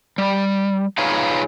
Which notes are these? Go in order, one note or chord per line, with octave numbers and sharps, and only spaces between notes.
G3
D#4 F4 G#4 B4 C#5 F5